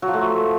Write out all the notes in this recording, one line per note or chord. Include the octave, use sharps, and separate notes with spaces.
F#3
F3
A3